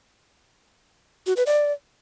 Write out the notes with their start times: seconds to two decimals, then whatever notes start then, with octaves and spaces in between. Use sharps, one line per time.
1.27 F#4
1.37 B4
1.46 D5